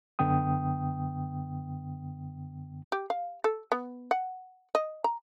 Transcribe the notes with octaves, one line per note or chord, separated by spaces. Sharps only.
F#2 D3 B3 G5 D#6
G4
F5
A4
B3
F#5
D#5
A#5